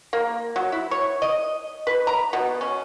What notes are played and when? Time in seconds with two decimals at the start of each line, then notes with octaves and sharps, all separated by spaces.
0.13 A#3
0.56 F#3
0.72 E4
0.91 C#5
1.22 D#5
1.87 B4
2.07 A#5
2.33 B2
2.61 C#4